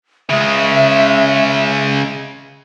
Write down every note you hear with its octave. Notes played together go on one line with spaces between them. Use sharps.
C#3 G#3 E5